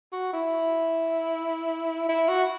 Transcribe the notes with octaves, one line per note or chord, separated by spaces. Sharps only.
F#4
E4
E4
F#4